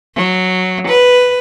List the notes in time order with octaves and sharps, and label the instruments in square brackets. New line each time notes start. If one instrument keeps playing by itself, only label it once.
[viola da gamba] F#3
B4